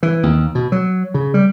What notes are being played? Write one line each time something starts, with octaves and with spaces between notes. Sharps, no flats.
E3
D#2
B2
F#3
C#3
G3